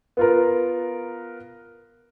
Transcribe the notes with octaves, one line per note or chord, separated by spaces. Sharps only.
B3 F4 A#4